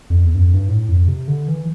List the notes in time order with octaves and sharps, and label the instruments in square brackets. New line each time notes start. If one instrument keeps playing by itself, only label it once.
[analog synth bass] F2
E2
G2
F2
G2
A2
F2
C3
D3
E3